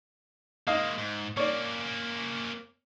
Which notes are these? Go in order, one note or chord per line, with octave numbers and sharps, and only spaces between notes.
G#3 A#3 D#5 F5
G#2
A#3 C#4 C#5 D5